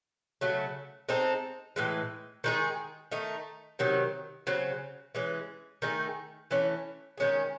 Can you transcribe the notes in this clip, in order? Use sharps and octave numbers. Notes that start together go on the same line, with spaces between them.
C#3 F#3 A3
G#3 C4 D#4 A4
A2 E3 G#3
D#3 G#3 D#4 G#4
D#3 A3 D#4
C3 D#3 F#3
C#3 F#3 C4
E3 G#3 C#4
D#3 A3 D#4 G#4
E3 A3 C#4
D#3 G#3 C#4 G#4